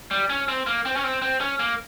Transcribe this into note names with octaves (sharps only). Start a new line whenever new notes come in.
G3
C#4
C4
A#3
C4
C#4
C4
C4
C#4
A#3